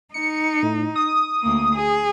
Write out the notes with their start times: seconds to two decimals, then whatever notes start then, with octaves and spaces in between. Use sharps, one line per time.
0.14 D#4 C#7
0.63 A2
0.96 D#6
1.43 D2 A#3
1.75 G#4